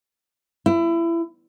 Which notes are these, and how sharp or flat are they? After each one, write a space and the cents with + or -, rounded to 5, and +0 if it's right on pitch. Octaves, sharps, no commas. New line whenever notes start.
E4 +25